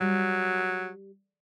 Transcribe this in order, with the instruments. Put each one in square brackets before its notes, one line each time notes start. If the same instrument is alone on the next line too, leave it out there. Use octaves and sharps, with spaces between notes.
[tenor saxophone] F#3 [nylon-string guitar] G3